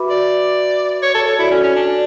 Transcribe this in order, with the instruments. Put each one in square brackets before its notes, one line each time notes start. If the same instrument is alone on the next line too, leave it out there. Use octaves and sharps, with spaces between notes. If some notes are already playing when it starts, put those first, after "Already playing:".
Already playing: [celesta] F#4 B4 E5 B5 D6
[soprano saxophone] D5
C#5
A4
C#5
[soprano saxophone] E4 [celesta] F#4 A4 D5
[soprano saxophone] C#4
C#4
D4